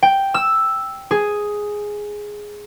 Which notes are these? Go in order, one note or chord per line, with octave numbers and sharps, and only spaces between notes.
G5
E6
G#4